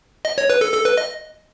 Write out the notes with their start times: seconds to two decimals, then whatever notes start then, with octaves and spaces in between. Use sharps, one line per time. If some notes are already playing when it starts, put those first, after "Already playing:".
0.25 D#5
0.38 C#5
0.50 B4
0.61 A4
0.74 A4
0.85 B4
0.97 D#5